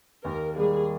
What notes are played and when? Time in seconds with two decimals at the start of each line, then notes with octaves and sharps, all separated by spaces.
0.24 D#2 A#4
0.56 D#3 G3 A#3 G#4